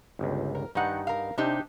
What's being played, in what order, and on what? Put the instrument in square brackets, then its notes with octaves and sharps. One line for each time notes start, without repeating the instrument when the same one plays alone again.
[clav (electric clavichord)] G1 C#2
[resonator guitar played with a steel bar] A#4
[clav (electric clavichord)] G2 D#4 [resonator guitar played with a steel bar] D#3 F#5
[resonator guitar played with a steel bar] A#4 F5
[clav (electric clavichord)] C3 [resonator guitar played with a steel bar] D4 D#4 G4